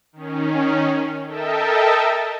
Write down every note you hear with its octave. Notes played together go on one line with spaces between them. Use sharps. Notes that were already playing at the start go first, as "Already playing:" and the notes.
D#3 C#4
A4 A#4 D#5 E5 G5 A5